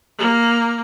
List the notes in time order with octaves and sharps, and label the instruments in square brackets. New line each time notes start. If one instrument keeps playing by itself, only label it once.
[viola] A#3